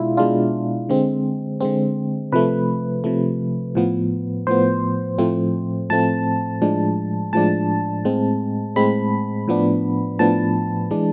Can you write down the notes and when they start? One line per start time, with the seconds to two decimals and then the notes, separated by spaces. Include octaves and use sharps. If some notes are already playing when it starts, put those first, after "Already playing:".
Already playing: B2 G#3 D4 E4 F4
0.17 B2 G#3 D4 F4
0.89 D3 G#3 C4
1.61 D3 G#3 C4
2.32 C3 F3 A3 B4
3.04 C3 F3 A3
3.75 A2 F3 B3
4.47 A2 F3 B3 C5
5.18 A2 F3 A3 C4
5.90 A2 F3 A3 C4 A5
6.62 A2 F3 G#3 D4
7.33 A2 F3 G#3 D4 A5
8.05 A2 G#3 C4
8.76 A2 G#3 C4 B5
9.48 A2 F3 B3 D4
10.19 A2 F3 B3 D4 A5
10.91 E3 G#3 D4